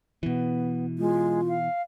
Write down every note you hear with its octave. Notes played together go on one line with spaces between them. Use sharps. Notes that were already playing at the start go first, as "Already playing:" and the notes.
B2 E3 B3
G#3 F4
F5